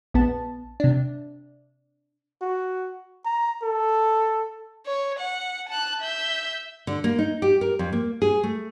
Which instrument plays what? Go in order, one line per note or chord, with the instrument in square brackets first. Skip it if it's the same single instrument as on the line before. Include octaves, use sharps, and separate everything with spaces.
[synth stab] A#1 B3 A5
C3 D4
[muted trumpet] F#4
A#5
A4
[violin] C#5
F#5
A5 F#6
E5 G6
[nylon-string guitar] D3
A#3
D#4
G4
A#4
F2
A#3
G#4
A3